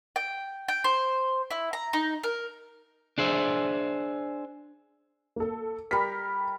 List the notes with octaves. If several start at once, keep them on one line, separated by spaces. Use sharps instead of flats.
G5
G5
C5
E4
A#5
D#4
A#4
D4 G#4 C5 E5
A#3 A4
G3 A#4 B6